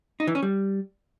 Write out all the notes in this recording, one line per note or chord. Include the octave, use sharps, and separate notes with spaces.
D#4
E3
C#4
G3